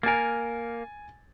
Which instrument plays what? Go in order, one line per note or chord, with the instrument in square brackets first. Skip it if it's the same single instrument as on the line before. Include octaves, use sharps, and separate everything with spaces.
[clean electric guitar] A#3 A#4 [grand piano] G#5 A6